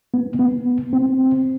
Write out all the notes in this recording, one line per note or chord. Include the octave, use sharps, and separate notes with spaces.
B3
B3
C4